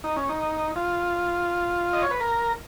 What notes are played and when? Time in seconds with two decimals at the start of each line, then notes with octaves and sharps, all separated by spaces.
0.04 D#4
0.17 C#4
0.29 D#4
0.76 F4
1.93 D#5
2.02 C#5
2.11 B4
2.20 A#4